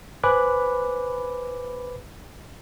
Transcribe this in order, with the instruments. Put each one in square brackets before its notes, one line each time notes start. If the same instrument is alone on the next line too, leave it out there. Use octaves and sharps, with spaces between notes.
[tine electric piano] B4 C5 G#5 B5 D6 F#6